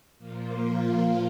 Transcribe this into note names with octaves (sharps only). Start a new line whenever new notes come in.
A#2 F3 A#3 F4